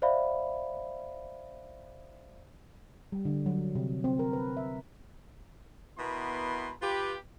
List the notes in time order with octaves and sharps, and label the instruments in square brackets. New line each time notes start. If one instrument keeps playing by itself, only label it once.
[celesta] C5 D5 E5 F5 B5
[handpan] G3
D3
F#3
C3
C4
A#4
B4
E5
[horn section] B2 B3 E4 A#4 B4 C6
F4 G4 B4